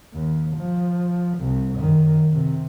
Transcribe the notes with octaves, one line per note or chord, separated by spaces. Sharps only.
D#2
F3
C2
F#2 D#3
C3